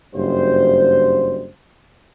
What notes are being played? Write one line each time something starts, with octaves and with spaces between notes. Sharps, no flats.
F#1 G2 C5